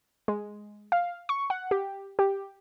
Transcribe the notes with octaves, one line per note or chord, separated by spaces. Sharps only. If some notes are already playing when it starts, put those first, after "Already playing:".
G#3
F5
C#6
F#5
G4
G4